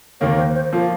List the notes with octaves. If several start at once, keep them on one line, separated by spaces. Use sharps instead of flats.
D#2 D#3 A#3 C#5
C5
C5
F3 A#3 F4